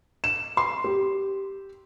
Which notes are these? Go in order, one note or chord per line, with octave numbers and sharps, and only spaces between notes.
E7
C6
G4